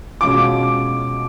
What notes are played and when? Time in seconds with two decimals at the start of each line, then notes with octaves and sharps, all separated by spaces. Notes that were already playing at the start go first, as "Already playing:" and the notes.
0.21 B2 G#3 C#4 F4 D6